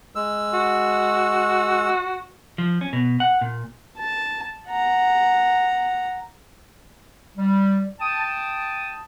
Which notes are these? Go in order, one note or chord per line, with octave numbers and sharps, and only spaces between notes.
G#3 E6
F#4
F3
C#4
B2
F#5
A#2
A5
F#5 A#5
G3
G5 A5 D#6